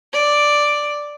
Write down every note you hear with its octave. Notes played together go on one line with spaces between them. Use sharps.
D5